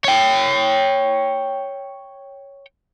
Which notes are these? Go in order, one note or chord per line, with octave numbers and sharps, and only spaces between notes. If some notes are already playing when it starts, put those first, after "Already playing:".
C#5 G5